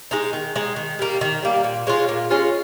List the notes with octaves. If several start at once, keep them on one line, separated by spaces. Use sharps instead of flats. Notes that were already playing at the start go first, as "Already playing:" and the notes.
G#3 D#4
D#3
G#3 D#4
D#3
G3 A#3
D#3
G3 A#3
A#2
G#3 C#4 F4
A#2
G#3 C#4 F4